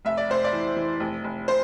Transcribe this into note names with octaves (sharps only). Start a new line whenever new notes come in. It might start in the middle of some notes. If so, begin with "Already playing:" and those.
F1 E5
D5
F1 C5
D5
E3
E3
F1
F1
C5